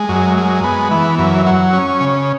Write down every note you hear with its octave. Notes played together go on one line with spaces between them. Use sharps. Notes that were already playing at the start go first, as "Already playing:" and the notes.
Already playing: G#3
F#2
G#3
B3
E3
F#2
F#3
C#4
C#3